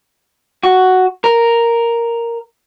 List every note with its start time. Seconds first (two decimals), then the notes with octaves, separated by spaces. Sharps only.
0.63 F#4
1.24 A#4